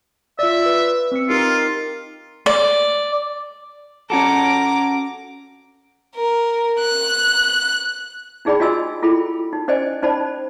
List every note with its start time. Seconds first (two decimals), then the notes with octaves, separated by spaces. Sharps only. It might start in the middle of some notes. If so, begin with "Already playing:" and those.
0.39 F4 D5 E5
0.66 B4
1.12 C4 E6 C#7
1.30 D#4 F4 G4 A#4
2.46 D5
4.10 C#4 F#4 A4 A#5 D6
6.16 A#4
6.80 F#6
8.45 D4 D#4 G#4 D5 G5 B5
8.60 D4 F4 F#4 D#5 G#5 E6
9.02 E4 F4 A4 G5 B5
9.53 D#4
9.68 C#4 C5 D5 D#5 G5 G#5
10.02 C#4 D#4 C5 D5 A5 B5